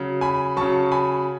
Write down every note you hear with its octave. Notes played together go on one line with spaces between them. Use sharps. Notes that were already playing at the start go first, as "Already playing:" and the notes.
Already playing: C#3 F#3
G#5 B5
C#3 F#3 A5 C#6
G#5 B5